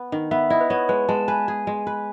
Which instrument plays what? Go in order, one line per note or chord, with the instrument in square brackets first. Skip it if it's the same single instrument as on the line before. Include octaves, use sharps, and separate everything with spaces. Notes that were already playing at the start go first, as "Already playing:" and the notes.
Already playing: [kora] B3
D#3
[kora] B3 [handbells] E5
[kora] E4 [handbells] D#5
[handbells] B4
[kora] B3 [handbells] C#5
[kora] G#3 [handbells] B4
[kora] G#3 [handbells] A5
[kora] B4 [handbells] G#5
[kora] G#4
G#3
B4